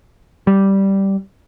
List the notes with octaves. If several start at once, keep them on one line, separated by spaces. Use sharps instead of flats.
G3